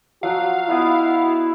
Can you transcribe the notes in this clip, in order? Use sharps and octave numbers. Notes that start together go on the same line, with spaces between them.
F3 F#3 F#4 F5 F#5
B3 E4 D#5